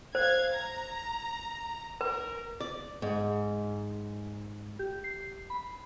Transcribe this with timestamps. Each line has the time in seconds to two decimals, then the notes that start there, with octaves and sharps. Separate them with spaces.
0.15 C5 F5 G#6
0.53 A#5
2.01 A#4 B4
2.61 D5
3.02 G#2
4.79 G4
5.04 C7
5.50 B5